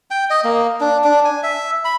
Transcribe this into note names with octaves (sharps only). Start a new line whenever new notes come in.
G5
D#5
A#3
D4
D4
G#5
E5
B5